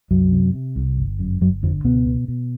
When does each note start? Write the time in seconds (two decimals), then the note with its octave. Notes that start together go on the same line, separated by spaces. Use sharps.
0.11 C2 F#2 F#3
0.32 C3
0.54 C3
0.76 C2
0.98 G1
1.19 F#2
1.41 G1 F#2 F#3
1.63 F2 D3 F3
1.84 C#2 B2 B3
2.07 B2
2.28 B2